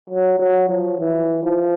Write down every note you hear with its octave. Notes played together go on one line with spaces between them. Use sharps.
F#3
F#3
F3
E3
F3